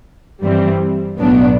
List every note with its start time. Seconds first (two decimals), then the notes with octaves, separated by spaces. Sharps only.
0.42 G2 E3 G3 C4
1.18 B1 A2 F#3 B3 D4